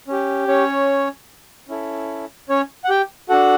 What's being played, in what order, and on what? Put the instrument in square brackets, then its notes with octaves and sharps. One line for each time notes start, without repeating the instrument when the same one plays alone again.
[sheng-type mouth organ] C#4 G4
C#4 C#5
C#4 E4 A4
C#4 C#5
F#5
G4 G5
D4 F#4 A4 F#5